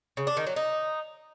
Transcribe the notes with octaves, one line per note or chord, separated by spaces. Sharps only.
C#3
D4
D#3
F#3
D#4